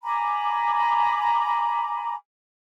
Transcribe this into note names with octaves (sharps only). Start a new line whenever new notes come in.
G#5 A#5 B5 D6